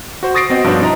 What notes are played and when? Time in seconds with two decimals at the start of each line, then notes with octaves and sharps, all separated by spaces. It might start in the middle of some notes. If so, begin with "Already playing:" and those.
0.23 F#4 C5
0.34 C#6 D#6 A6 A#6 C7 D7
0.50 B3 C4 F#4 D#5
0.64 G2 B2 F3 C#4 D4 C5
0.81 D4 E4 B4 D#5 A#5